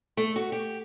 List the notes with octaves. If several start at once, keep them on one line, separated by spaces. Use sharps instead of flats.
A3
F#4
G4